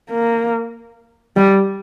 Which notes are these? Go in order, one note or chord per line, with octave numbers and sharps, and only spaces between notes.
A#3
G3